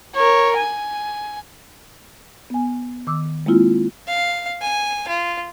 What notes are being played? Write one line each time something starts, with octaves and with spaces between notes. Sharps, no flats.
A#4 C#5
G#5
B3 G#5
D#3 D6 E6
G#3 A#3 C4 E4 F4
F5
G#5
F4